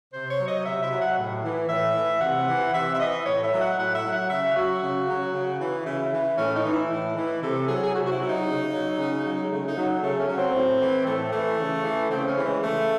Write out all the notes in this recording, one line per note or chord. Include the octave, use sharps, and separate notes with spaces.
C3 C5
C#5
F#3
D#5
C3 E5
E5
F#3
F#5
A2
E3
A2 E5
E3
C3 F#5
E3
C3 E5
E5
E3 D#5
A2 C#5
E5
F#3
F#5
A2 F#5
E5
F#3
F#5
C#3 E5
F#3 F#4
C#3
F#3
C#3
E3
C#3 E4
E3
A2 C#4
D#4
E3
E4
A2
E3
C3 A4
F#3 G#4
G#4
C3 F#4
F#4
E4
F#3
D#4
C#3
F#3
C#3
F#3
G#3
C#3 A3
D#4
F#3
C#3 A3
C#4
F#3
C4
A2
E3
A2 A3
E3 A3
C#3
E3
C#3 C4
C#4
E3
G#3
C#3 A3